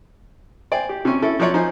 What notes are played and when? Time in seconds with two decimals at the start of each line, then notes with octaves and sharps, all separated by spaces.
0.72 C5 D5 G5 G#5
0.89 G4
1.05 C3 C#4
1.22 C#4 E4 A4
1.40 F3 F#3 F4 C#5 D5
1.54 F3 D#4 C5 G#5